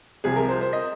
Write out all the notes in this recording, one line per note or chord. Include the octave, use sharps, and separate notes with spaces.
C2 C3 F3 G#4
A#4
C5
C5
D#5